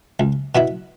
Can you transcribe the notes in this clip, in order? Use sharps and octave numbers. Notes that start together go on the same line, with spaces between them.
C#2
B2 B3 E4